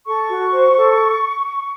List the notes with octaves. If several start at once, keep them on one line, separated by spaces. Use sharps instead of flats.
A4 C#6
F#4
C5
A4